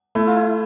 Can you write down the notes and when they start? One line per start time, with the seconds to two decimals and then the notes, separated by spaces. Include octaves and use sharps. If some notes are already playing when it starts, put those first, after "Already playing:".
0.15 A3 E4
0.27 F4
0.37 E4